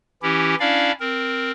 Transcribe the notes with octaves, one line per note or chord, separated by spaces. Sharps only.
E3 C#4 E4 G4
C#4 D4 E4 D5 F5
C4 A#4